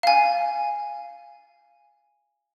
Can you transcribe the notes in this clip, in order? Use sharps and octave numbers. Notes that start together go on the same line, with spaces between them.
F5 G#5